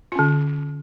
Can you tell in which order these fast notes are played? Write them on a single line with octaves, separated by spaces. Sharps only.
F4 C#4 D3